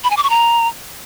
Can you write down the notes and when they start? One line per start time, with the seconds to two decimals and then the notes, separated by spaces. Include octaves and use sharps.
0.04 B5
0.10 G#5
0.17 D6
0.23 C#6
0.30 A#5